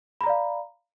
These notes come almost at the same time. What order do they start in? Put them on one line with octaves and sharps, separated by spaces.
B5 A#5 D5 F5